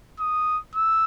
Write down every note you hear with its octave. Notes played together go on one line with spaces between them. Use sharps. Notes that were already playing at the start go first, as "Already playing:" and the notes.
D#6
E6